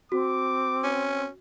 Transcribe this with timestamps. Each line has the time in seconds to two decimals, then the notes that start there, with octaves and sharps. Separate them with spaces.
0.12 C4 F#4 D6
0.84 C#4